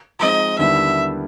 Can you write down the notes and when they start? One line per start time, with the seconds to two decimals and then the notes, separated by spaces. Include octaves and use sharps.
0.19 F3 G#3 C4 D#4 D#5
0.58 D#2 D3 G3 B3 E4 E5